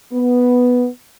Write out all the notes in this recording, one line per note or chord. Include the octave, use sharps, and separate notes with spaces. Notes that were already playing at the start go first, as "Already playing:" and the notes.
B3